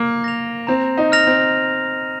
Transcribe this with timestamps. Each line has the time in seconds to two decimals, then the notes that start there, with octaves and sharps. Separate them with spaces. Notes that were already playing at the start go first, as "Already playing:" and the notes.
Already playing: A#3
0.24 A#6 F7
0.67 C4 A#5
0.98 D#4
1.12 F6 A#6 F7
1.27 C4